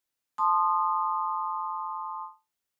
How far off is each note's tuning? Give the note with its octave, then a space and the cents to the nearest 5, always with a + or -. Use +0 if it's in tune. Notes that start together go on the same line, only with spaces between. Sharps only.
A5 -5 C6 +0 D#6 -25